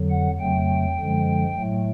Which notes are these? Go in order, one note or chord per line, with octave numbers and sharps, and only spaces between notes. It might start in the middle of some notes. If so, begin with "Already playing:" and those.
Already playing: F2 D3 F#3
F#5
F2 C#3 F#3 A3 G5
F#2 D3 F3 G#3
A2 F#3 A3